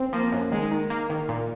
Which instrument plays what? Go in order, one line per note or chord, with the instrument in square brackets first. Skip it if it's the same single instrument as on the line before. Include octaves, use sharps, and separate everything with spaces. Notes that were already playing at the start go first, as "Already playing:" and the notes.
Already playing: [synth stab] C4
[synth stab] F3 [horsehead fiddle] A#3
[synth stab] F#2
[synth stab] D#3 [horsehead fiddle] G#3
[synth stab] D#3
A#3
D#3
A#2